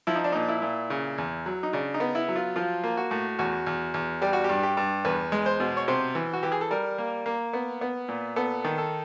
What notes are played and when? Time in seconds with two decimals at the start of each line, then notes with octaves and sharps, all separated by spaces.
0.07 F3 E4
0.16 D#4
0.24 D4
0.32 A#2 D#4
0.49 E4
0.62 A#2
0.90 C#3
1.18 E2
1.46 F#3
1.63 D#4
1.73 C#3 D4
1.94 D#4
2.00 B3
2.15 E4
2.28 F#3
2.36 F4
2.56 F3 F4
2.84 A#3
2.97 F#4
3.11 A2
3.39 E2 F#4
3.66 E2
3.94 E2
4.22 G3 G4
4.33 F#4
4.44 G4
4.49 G2
4.63 G4
4.77 G2
5.05 E2 B4
5.32 G#3
5.46 C5
5.60 B2
5.77 C#5
5.88 C3 C5
6.15 E3
6.33 F#4
6.43 E3 G4
6.52 G#4
6.61 A4
6.71 G3 A#4
6.98 A#3
7.26 A#3
7.53 B3
7.81 B3
8.09 A#2
8.36 B3 A4
8.64 D#3
8.78 A4